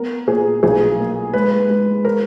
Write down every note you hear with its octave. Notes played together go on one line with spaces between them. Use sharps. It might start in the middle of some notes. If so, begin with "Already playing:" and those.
Already playing: B3 A#4
A#2 G#4
B1 G#4
A#3
G#3 B4
G#3
A#4